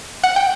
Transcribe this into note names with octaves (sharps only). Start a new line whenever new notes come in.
F#5
G5